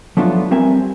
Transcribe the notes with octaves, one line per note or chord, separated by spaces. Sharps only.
F3 F#3 A3 B3 D4 F4
G3 C4 A#4 E5 G#5